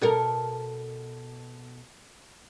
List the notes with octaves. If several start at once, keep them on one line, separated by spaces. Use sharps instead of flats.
B2 A4 A#4